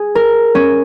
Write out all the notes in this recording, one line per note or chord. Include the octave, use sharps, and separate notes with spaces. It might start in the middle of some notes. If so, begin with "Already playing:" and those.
Already playing: G#4
A#4
C#4